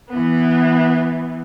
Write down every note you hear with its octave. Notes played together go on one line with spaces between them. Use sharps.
E3 B3